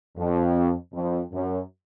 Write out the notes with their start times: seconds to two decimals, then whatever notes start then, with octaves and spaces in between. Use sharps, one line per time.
0.18 F2
0.94 F2
1.32 F#2